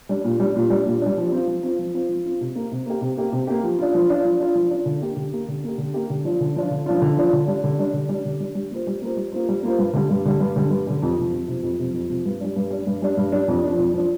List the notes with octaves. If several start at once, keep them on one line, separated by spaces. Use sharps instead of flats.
G3 D4
A#2
G3 D4
A#2
G3 D4
A#2
G3 D4
F3
C4 F4
F3
C4 F4
F3
C4 F4
F3
C4 F4
C3
A#3 G4
C3
A#3 G4
C3
A#3 G4
C3
A#3 G4
F3
D4 F4
F3
D4 F4
F3
D4 F4
F3
D4 F4
D3
A#3 G4
D3
A#3 G4
D3
A#3 G4
D3
A#3 G4
D3
F3 D4 F4
D3
F3 D4 F4
D3
F3 D4 F4
D3
F3 D4 F4
D3
G3 D4
D3
G3 D4
D3
G3
D4
D3
G3 D4
G3
A#3 F4 C5
G3
A#3 F4 C5
G3
A#3 F4 C5
G3
A#3 F4 C5
G2
D3 G3
G2
D3 G3
G2
D3 G3
G2
D3 G3
F2
C3 F3
F2
C3 F3
F2
C3 F3
F2
C3 F3
G2
G3 D4
G2
G3 D4
G2
G3 D4
G2
G3 D4
F2
F3 D4
F2
F3 D4